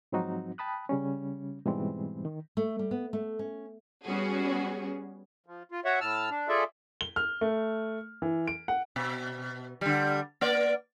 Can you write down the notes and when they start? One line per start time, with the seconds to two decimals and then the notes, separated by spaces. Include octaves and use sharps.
0.12 G#2 F3 F#3 C4 D#4 F#4
0.58 G5 A5 B5 D#6 F#6
0.89 C#3 G3 C#4
1.65 G#2 B2 E3 G3 G#3 C4
2.25 D#3
2.57 A3
2.79 G3
2.91 B3
3.13 A3
3.39 C#4
4.05 G3 B3 C#4 F#4 G#4
5.46 F3
5.72 F4
5.85 F#4 C#5 E5 F#5
6.01 A2 A5 E6 F6
6.30 D4
6.49 F4 G#4 A4 D5 E5
7.01 G7
7.16 F6
7.41 A3
8.22 E3
8.48 D7
8.68 F#5
8.96 B2
9.81 D3 G3
10.41 A#3 D5